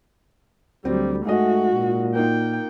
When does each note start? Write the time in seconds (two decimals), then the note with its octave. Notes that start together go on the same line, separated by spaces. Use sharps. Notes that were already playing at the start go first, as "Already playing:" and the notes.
0.85 D2 F#3 G3 C4
1.25 G#2 G#3 A3 F#4 D#5
1.75 A#2
2.15 A#3 D#4 F4 G5